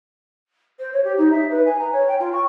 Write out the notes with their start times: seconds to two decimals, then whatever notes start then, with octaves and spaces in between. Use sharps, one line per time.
0.79 C5
0.93 C#5
1.04 G4
1.18 D#4
1.31 E5
1.51 B4
1.66 G#5
1.79 A#5
1.93 C#5
2.08 G5
2.20 F4
2.33 C#6